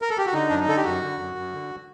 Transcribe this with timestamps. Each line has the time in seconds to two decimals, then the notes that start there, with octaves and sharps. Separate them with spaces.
0.02 A#4
0.10 A4
0.18 G4
0.26 F#4
0.33 D3 D#4
0.49 F#2 D4
0.59 D#4
0.67 D3 A4
0.77 G4
0.84 F#2 F#4
1.02 D3
1.18 F#2
1.36 F#2
1.52 D3